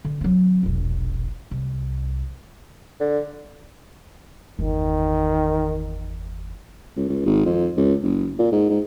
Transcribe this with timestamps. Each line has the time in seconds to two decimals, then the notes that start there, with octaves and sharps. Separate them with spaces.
0.05 D3
0.21 F#3 C4
0.63 E1 A#1
1.51 C2
3.00 D3
4.59 G1 E2 D#3
6.96 C#2
7.09 C#2
7.26 G#1
7.46 F2
7.77 C#2
8.02 F#1
8.39 A#2
8.52 G#2
8.69 G#2